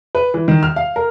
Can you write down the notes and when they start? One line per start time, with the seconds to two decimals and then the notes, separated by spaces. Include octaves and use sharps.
0.15 B4
0.34 E3
0.48 D#3
0.63 F6
0.76 F5
0.96 A#4